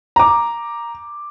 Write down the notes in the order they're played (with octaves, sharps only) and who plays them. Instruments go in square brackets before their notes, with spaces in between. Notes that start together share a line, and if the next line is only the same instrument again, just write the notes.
[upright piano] A#5 D6